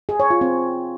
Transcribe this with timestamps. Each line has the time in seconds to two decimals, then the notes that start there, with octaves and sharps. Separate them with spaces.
0.09 G#4
0.20 C#5
0.30 F4
0.41 C4